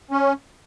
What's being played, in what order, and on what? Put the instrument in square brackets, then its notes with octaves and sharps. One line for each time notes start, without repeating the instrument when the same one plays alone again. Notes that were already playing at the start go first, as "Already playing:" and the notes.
[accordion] C#4